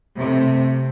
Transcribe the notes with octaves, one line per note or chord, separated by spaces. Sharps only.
C3 A3